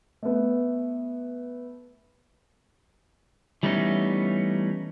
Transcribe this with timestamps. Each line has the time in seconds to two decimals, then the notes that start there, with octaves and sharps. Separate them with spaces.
0.23 A3 B3
3.63 E3 G3 A3 B3 C#4 D#4